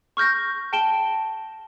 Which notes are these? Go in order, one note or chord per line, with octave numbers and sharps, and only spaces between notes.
C#6 F6 G6 A#6
G5 A5 D7 E7 G7